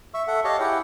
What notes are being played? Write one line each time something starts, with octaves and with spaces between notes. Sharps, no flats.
E5 C#6 E6
A4 E5 F#5
G4 C#5 D#5 F5 A5
E4 G4 G#4 F#5 G5